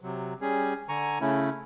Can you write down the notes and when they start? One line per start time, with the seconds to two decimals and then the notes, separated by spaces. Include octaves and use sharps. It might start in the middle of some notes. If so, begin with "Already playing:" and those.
0.01 C3 F#3
0.41 G3 C#4 G#4
0.89 D3 G#5 A#5 C#6
1.21 C#3 A3 C#4 E4